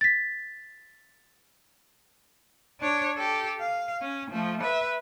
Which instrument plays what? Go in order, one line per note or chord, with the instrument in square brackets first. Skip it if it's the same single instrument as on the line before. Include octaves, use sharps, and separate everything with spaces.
[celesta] A6 B6
[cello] D4 C#5
G4 A4
F5
C#4
F3 A3
B4 E5